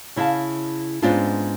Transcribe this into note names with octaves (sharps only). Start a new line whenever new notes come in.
C#3 E4 D#5 F5 A5
G#2 B3 C#4 D4 F4